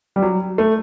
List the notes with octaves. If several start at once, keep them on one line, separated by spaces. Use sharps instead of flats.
G3
F#3
A3